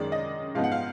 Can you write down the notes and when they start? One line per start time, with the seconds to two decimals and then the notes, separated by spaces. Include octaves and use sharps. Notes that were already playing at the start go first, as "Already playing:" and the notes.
Already playing: F#2 D#3 G#3 D5
0.12 D#5
0.55 G#2 F3 B3 D#4 F5
0.64 F#5
0.72 F5